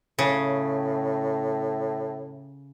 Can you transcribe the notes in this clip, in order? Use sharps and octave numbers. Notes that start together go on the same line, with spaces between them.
A2 C#3